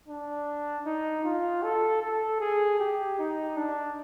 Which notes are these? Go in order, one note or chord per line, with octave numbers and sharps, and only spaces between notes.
D4
D#4
F4
A4
A4
G#4
G4
D#4
D4